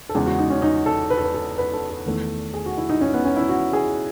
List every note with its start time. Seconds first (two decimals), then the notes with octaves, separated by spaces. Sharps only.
0.09 A4
0.15 E2 C#3 G#3 G#4
0.26 F#4
0.38 D#4
0.50 C#4
0.62 D#4
0.86 A4
1.10 B4
1.18 A4
1.24 B4
1.34 A4
1.58 B4
1.73 A4
1.90 A4
2.06 E2 D#3 A3
2.54 G#4
2.66 F#4
2.78 E4
2.89 D#4
3.01 C#4
3.14 B3
3.25 C#4
3.36 E4
3.49 F#4
3.73 G#4